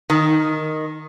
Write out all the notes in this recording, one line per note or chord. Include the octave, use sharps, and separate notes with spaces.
D#3